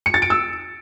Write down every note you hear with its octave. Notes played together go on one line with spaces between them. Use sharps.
C#7
A6
D7
E6